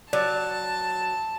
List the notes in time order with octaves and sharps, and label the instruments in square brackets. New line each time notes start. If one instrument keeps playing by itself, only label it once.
[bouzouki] F#3 [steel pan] D5 [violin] A5